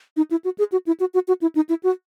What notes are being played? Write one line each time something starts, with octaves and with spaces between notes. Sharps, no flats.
D#4
E4
F#4
G#4
F#4
E4
F#4
F#4
F#4
E4
D#4
E4
F#4